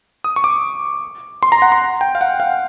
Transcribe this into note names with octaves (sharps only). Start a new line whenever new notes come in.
D#6
C#6
D6
C6
A#5
F#5
C6
G5
F5
F#5
F5